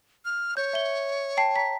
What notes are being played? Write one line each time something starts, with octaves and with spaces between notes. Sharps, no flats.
F6
C#5 G6
E5 G7
G5 A5 C7
A#5 B6